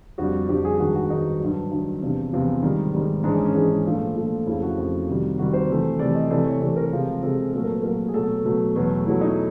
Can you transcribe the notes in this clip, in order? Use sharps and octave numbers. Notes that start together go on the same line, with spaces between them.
F2 D3 G3 F#4
F2 D3 G3 G4
G#4
G2 D#3 G#3 F#4
F#4
G2 D#3 G#3 D#4
G2 D#3 F#3 D4
G2 D#3 F#3
E2 C3 F3 D4
E2 C3 F3
G#2 D#3 G3
G#2 D#3 G3
G#2 E3 G#3 D4
C#4
C#4
G#2 E3 G#3 D4
D4
A#2 F3 A3 D4
A#2 F3 A3
F2 C#3 F3 A3 E4
F#4
F2 C#3 F3 A3
C3 D#3 G3
C3 D#3 G3 F#4
C5
C3 E3 A3
C3 E3 A3 D5
D#5
C3 E3 A3 D5
C#5
C3 E3 A3 D5
A#4
C3 F3 G#3
C3 F3 G#3 A4
G#4
A#2 F#3 A3 A4
A#4
B4
A#2 F#3 A3 A#4
G#4
B2 F#3 A3 A4
B2 F#3 A3
E2 B2 F#3 A3
E2 B2 F#3 A3 E4
D#4